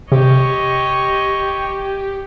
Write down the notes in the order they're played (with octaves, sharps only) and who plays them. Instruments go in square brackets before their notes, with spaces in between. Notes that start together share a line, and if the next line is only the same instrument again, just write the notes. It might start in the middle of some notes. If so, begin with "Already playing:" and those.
[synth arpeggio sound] C3 [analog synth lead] G4 [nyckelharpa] C#5 D#5